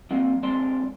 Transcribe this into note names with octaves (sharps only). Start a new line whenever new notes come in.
F#3 A#3 C4
D3 G#3 C4 D4 A5 C6